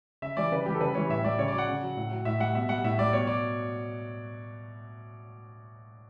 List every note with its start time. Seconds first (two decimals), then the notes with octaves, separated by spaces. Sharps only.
0.22 C#3 E5
0.37 E3 G3 D5
0.51 C#3 B4
0.66 E3 G3 G4
0.74 A4
0.81 C#3 B4
0.95 E3 G3 C#5
1.09 A2 E5
1.24 G3 D5
1.39 C#3 C#5
1.48 D5
1.53 F#3 F#5
1.68 C#3
1.83 F#3
1.97 A2
2.11 F#3
2.25 A2 E5
2.40 G3 F#5
2.55 B2 E5
2.69 G3 F#5
2.84 A2 E5
2.99 G3 D5
3.13 B2 C#5
3.27 F#3 D5